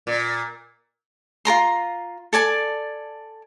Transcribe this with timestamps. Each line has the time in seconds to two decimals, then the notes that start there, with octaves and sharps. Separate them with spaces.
0.07 A#2
1.45 F4 A#4 A#5 C6
2.33 A4 D5 G#5 A5